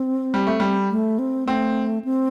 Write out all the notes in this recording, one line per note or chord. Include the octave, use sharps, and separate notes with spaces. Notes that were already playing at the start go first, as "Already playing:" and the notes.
Already playing: C4
G3
A3
G3
A3
C4
A3 C4
C4